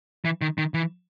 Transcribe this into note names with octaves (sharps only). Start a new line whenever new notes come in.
E3
D#3
D#3
E3